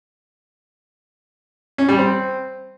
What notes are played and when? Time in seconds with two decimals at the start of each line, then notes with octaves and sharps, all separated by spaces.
1.78 C#4
1.89 G3
1.99 C4